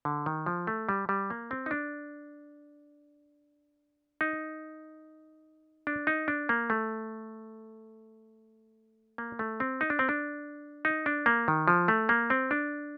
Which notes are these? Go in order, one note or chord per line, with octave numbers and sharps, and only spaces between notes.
D3
D#3
F3
A3
G3
G3
A#3
C4
D#4
D4
D#4
D4
D#4
D4
A#3
A3
A#3
A3
C4
D#4
D4
C4
D4
D#4
D4
A#3
D#3
F3
A3
A#3
C4
D4